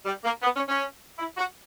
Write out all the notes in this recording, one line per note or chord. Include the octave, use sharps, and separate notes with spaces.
G3
A#3
B3
C#4
C#4
E4
F#4